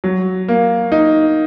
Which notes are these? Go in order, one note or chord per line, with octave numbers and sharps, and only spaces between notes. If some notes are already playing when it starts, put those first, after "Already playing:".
F#3
A#3
D#4